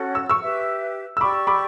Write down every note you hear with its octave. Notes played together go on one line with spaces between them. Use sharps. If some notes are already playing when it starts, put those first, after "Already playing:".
Already playing: C#4 F#4 A4
E6
C#6 E6
G4 B4 E5
E6
G4 D5 G5 B5 C#6 D6
B5 D6